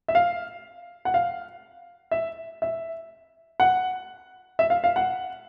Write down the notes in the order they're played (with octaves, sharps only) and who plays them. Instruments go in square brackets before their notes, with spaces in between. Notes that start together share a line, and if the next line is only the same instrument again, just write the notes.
[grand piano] E5
F5
F#5
F5
E5
E5
F#5
E5
F5
F5
F#5